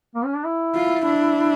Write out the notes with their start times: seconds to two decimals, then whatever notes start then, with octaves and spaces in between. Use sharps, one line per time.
0.15 A#3
0.25 C#4
0.36 D4
0.44 E4
0.75 F4
1.06 D4